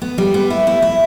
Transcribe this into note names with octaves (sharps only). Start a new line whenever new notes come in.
B3
G3
B3
E4
E4
E4